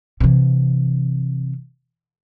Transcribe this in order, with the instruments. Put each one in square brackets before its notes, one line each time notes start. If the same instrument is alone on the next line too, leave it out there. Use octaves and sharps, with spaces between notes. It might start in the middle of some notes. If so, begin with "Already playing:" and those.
[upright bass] C3 E3